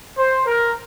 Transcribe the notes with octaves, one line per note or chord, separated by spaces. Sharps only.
C5
A#4